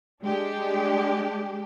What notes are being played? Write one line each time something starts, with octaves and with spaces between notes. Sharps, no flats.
G#3 D4 G4